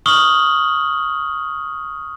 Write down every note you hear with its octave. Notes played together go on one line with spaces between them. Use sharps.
C#6 D#6 F6 F#7 G7